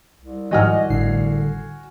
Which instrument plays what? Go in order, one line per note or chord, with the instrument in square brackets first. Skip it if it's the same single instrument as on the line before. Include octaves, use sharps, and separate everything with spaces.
[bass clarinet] C2
[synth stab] G#2 D#3 F3 [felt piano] F#4 G#5 F6 [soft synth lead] D#5
[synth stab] G#1 A2 C7 [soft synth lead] D3